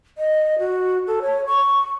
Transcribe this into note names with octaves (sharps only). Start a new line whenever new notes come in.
D#5
F#4
A4
C#5
C#6